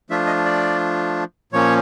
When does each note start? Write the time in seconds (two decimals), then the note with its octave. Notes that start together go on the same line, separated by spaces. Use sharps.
0.10 F3 A3 D4 F4 E5
0.27 D#5
0.45 D5
1.52 A#2 F3 A#3 C#4 C#5